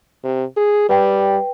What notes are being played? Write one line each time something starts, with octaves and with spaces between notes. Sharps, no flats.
C3
G#4
G3 B4 G5